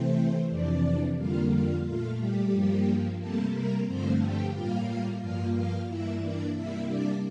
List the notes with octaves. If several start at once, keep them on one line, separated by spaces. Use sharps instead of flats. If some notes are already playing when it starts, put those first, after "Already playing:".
Already playing: C3 E3 A3 C4 C5
F2 C3 E3 D4 D5
F2 D3 G3 A#3 F4 F5
F4 F5
A#2 A3 F4 F5
G3 G4
G2 F3 A#3
C3 G3 A3 A#3 A4
A#3 A#4
G2 D3 F3 A3 C4 C5
G4 G5
A2 G3 A#3 F4 F5
G2 F3 A#3 F4 F5
F4 F5
G2 E3 A#3 E4 E5
D4 D5
C3 G3 A#3 E4 E5
D4 D5